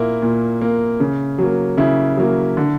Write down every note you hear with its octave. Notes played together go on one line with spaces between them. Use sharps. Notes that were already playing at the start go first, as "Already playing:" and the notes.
Already playing: A#2 A#3 E4
A#2
A#3
C#3
F#3 A#3
C#3 E4
F#3 A#3
D3